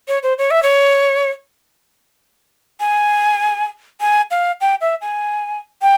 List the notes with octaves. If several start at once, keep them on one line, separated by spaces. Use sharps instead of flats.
C#5
C5
C#5
E5
C#5
G#5
G#5
F5
G5
E5
G#5
G5